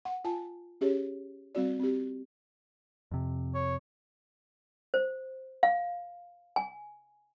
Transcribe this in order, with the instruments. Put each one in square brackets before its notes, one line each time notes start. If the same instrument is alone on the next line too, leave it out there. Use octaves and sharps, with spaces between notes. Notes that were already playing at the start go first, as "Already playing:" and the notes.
[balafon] F#5
F4 G#5 A5
C#4 G4 G#4 C#5
G3 C4 F#4 D5
C4 G4
[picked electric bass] F2 C3
[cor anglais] C#5
[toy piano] C5
F5
G#5